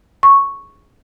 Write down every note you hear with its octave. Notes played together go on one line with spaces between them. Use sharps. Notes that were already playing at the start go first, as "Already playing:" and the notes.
C#6